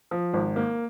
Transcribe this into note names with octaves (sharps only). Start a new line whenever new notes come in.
F3
G#1
A#3